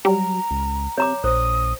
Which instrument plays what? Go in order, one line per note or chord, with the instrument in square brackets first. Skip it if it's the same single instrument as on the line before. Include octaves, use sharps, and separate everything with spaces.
[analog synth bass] F#3 [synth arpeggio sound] G3 [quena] A#5
[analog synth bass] C#2
[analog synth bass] C3 [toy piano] C#5 A#5 D6
[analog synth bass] A#1 [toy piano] C5 [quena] D#6